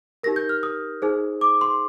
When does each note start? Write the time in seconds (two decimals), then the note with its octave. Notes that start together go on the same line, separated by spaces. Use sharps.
0.23 D#4 G4 A#4 A#6
0.36 G6
0.49 F6
0.63 D#6
1.02 D#4 G#4 C5
1.41 D6
1.61 C6